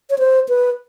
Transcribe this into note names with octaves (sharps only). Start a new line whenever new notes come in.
C#5
C5
B4